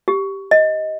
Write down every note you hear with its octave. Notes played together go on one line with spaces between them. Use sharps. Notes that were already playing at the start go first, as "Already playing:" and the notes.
G4
D#5